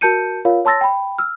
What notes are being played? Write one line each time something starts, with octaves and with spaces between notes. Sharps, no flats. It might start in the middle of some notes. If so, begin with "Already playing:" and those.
F#4 A#4 A5 G6 C#7 D#7
F4 A#4 C#5 F5
C#5 A5 C6 E6 A6 A#6
G5 B5
E6 F6